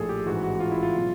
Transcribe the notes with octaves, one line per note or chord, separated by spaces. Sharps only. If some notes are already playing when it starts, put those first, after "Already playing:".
Already playing: A#1 A2 F3 G#4 A4
G4
A1 G#2 E3 F#4
F#4
F4
E4
F4
B2 F#3